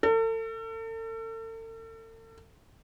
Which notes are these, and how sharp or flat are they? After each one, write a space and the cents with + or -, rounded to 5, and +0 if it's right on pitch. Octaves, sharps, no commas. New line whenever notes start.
A4 +40